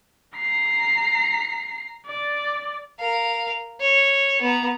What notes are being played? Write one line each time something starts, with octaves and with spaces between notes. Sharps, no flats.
A#5 C7
D5
A#4 F5
C#5
B3 A#5